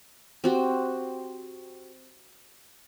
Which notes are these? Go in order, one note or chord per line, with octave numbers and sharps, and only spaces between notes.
C4 F#4 G4